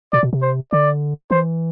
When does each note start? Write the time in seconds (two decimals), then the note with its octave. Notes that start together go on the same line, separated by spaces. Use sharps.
0.13 B2 D5
0.23 B2
0.33 C3
0.42 C5
0.72 D3 D5
1.31 E3 C5